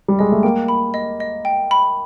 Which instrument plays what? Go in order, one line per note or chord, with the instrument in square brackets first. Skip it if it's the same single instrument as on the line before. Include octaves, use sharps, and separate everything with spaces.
[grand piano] G3
[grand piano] G#3 [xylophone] D#5
[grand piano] A3
[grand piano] A#3 [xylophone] G5
[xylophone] B5
D#5
D#5
G5
B5